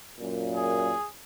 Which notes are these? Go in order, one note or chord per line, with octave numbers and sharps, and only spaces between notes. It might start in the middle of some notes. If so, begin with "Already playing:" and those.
F#2 A#2
G#4